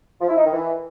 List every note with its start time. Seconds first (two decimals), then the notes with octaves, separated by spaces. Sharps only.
0.21 F3
0.29 E4
0.37 D#4
0.45 D#3
0.54 E3